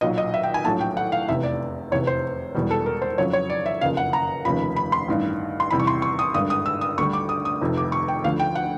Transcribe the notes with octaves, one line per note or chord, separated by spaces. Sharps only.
B1 A#2 F#3 D#5
D#5
E5
G5
G#5
A#1 A2 F#3 A5
G5
F#5
F5
F1 E2 C3 E5
D5
F1 E2 C3 C#5
C5
E1 E2 B2 G3
A4
A#4
C5
F2 C#3 F#3 C#5
C#5
D5
E5
F#1 F2 C#3 F5
F#5
A#5
F1 D#2 C#3 F3 B5
B5
C6
A1 G2 D#3
C6
E2 C3 E3 G3 B5
C#6
C6
C#6
D#6
G#1 G2 D3 D#6
D#6
E6
D#6
D2 D3 G3 C#6
D6
D#6
D#6
F1 F2 C3 D#3
D6
C#6
G5
D2 D3 F3 F5
G5
F#5